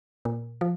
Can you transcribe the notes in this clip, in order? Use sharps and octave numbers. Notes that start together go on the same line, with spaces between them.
A#2
F3